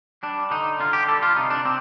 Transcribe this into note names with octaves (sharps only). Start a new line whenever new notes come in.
G3 D4
D3 D#4
D3 F4
G4
G3 A4
F4
C3 D#4
D4
C3 C4